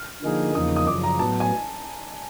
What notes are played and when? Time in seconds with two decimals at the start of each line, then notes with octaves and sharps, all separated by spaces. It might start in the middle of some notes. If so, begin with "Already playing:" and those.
Already playing: F6
0.22 D3 F3 A#3 D#4 G#4
0.55 E2 C#3 F3 A#3 D#4 D#6
0.76 D#6
0.87 F#2 C#3 F3 D6
1.03 A#5
1.19 A2 F#3 B3 A5
1.40 G#5